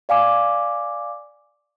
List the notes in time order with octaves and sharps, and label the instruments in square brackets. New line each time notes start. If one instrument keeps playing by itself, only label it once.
[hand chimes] D5 F5 G#5 D6